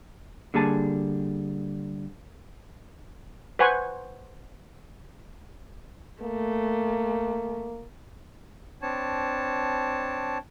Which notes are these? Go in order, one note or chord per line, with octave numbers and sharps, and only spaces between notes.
D3 G3 A#3 G#4 G#5 A5
B4 C5 F#5 G#5 C#6
A3 A#3
C4 D4 C#5 A5